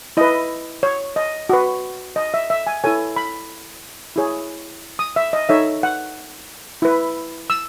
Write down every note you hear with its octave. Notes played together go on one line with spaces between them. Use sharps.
E4 B4 D#5
C#5
D#5
F#4 B4
D#5
E5
E5
G#5
E4 A4 C#5 G#5
B5
E4 G#4 C#5
D#6
E5
D#5
D#4 A4 C#5 E5
F#5
E4 B4
E6